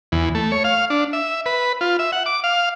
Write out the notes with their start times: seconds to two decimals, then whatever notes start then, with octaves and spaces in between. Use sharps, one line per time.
0.12 E2
0.35 A3
0.52 C#5
0.64 F5
0.90 D4
1.13 E5
1.46 B4
1.81 F4
1.99 E5
2.12 F#5
2.26 D6
2.44 F5